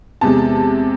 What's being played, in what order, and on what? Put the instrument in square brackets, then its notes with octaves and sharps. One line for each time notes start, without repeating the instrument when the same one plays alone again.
[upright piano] E2 C3 G#3 A5